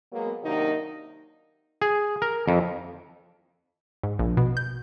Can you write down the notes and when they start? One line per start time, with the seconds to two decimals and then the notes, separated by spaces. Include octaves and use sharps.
0.13 F#3 G#3 A#3 B3
0.43 C3 D#3 F#3 A#3 D4 D#4
1.82 G#4
2.22 A#4
2.48 F2
4.03 G#2
4.19 A#1
4.37 B2
4.57 G6